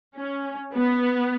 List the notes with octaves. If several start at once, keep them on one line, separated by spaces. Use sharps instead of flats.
C#4
B3